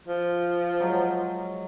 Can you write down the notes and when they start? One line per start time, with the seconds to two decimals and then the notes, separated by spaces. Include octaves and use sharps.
0.07 F3
0.80 F#3 G#3